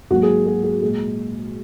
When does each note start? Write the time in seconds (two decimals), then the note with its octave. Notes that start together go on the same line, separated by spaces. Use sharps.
0.10 G#2 F#3 A#3 F#4
0.23 G#4
0.46 G#4
0.64 G#4
0.81 A#2 G#3 G#4